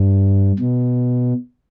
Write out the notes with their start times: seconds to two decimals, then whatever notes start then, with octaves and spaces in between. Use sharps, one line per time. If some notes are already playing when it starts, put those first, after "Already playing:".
Already playing: G2
0.60 B2